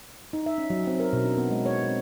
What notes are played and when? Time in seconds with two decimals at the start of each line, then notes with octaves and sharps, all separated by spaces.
0.33 D#4
0.46 E5
0.58 C#4
0.70 F#3
0.87 C4
1.00 A#4
1.13 B2
1.25 D4
1.38 B3
1.51 G#3
1.66 C#5
1.83 C4